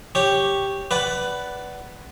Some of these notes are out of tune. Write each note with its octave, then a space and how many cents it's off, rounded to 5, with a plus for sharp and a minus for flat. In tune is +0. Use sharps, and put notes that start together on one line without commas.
G4 +0 C#5 +0
B4 +0 D5 -10 F#5 +20